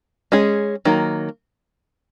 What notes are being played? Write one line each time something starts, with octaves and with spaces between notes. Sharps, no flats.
G#3 C#4 G#4
D#3 F#3 A#3